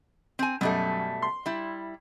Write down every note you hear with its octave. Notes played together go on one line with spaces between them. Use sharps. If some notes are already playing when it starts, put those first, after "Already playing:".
C4 G#5
F#2 B2 G3 A3
C6
G3 E4